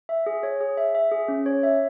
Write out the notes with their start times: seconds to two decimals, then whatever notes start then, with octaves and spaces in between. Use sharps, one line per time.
0.09 E5
0.26 G#4
0.43 C#5
0.61 G#4
0.77 E5
0.95 E5
1.12 G#4
1.28 C#4
1.46 C#5
1.63 E5